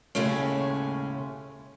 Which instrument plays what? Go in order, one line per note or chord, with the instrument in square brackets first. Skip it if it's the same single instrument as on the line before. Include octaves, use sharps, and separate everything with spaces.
[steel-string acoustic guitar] D#2 A2 C#3 G#3 A3 C#4